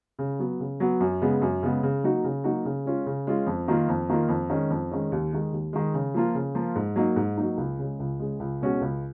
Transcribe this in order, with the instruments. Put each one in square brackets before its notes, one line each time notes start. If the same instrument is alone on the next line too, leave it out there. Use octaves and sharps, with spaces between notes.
[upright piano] C#3
F#3 B3
C#3
F#3 B3
F#2
C#3 G#3 B3
F#2
C#3 G#3 B3
C#3
F#3 A#3 D#4 F#4
C#3
F#3 A#3 D#4 F#4
C#3
G#3 C#4 F4
C#3
G#3 C#4 F4
F2
D#3 A#3 F4
F2
D#3 A#3 F4
F2
D#3 G#3 C#4
F2
D#3 G#3 C#4
D#2
D#3 G#3
D#2
D#3 G#3
C#3
F3 A#3 F4
C#3
F3 A#3 F4
G#2
F#3 A#3 D#4
G#2
F#3 A#3 D#4
C#2
C#3 G#3
C#2
C#3 G#3
C#2
B2 G#3 C#4 F#4
C#2